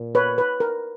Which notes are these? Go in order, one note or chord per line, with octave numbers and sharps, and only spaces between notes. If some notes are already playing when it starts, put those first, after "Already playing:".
Already playing: A#2
B4 C#5
B4
A#4